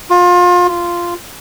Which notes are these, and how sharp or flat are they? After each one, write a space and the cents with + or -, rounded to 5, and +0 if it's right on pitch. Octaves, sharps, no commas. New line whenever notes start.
F4 +30
F4 -10